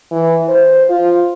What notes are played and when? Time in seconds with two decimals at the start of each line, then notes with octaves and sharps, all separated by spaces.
0.12 E3
0.49 C5
0.89 F4